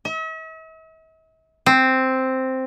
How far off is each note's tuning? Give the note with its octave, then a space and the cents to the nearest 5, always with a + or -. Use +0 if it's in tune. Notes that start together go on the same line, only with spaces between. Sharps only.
E5 -45
C4 +0